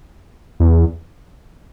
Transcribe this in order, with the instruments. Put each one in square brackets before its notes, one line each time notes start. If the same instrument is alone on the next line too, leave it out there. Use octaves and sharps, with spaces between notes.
[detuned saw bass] E2